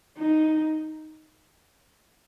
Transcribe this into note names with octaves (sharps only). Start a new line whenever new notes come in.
D#4